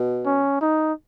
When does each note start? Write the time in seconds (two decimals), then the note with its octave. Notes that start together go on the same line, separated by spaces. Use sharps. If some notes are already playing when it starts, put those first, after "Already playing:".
Already playing: B2
0.25 C#4
0.61 D#4